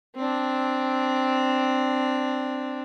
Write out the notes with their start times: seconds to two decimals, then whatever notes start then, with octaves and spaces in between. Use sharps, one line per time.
0.16 C4 D4